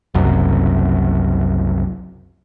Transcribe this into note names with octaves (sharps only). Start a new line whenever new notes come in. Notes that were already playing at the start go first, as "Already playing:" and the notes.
F#1 C2 F#2